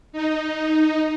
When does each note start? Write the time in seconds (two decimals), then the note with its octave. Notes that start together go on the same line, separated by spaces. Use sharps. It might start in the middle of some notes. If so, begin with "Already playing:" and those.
0.13 D#4